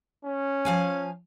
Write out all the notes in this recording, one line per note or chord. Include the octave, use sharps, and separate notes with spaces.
C#4
F3 F5 G#5